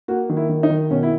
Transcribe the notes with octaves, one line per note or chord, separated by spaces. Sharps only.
A#3 F#4
D#3
E4
D#3
D#4
D#3
B2 C#4
E4